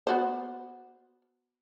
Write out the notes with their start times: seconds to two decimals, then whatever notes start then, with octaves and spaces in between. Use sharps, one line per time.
0.07 B3 F#4 C5